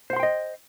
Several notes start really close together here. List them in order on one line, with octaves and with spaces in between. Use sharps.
C5 F#5 C6 G5 D#5